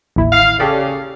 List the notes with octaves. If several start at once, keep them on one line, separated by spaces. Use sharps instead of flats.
A1 D#2 E4
F5
C#3 G4 A4 D5